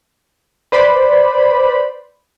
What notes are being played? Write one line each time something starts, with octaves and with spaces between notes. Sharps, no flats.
B4 C5 D5 B5